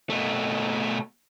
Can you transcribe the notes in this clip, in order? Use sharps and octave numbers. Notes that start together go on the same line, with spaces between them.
B2 A3